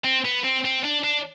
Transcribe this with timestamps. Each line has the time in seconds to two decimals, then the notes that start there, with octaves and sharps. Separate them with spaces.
0.05 C4
0.25 B3
0.44 C4
0.64 C4
0.84 D4
1.04 D4